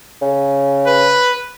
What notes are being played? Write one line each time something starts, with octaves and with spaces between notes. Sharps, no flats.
C#3
B4